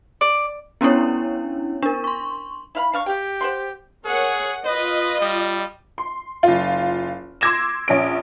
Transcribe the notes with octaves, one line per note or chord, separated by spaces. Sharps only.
D5
B3 C#4 D4 E4 C#5
D4 A#4
C6 C#6
E4 F5 B5
D4 F5 C#6
G4 F5 G5
C5 F#5 C6
G#4 A#4 C#5 F#5
F4 B4 D#5
G3
C6
F#1 F4
C6 D6 E6 G#6 A#6 E7
A#1 C#4 D7